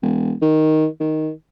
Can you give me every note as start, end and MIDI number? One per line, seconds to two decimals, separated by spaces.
0.03 0.33 28
0.42 0.87 51
1.00 1.30 51